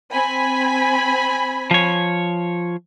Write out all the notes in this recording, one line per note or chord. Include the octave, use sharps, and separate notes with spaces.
C4 G#5 B5
F3 C#5